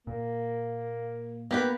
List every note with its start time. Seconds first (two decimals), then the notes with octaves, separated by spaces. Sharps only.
0.07 A#2 A#3
1.51 A#3 B3 G4 B4